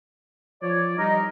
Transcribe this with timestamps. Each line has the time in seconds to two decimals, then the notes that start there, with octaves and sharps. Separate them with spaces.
0.62 F3 C#5 D5
0.98 G3 D#4 A#4 D#5